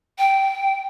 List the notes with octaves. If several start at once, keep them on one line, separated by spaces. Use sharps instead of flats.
G5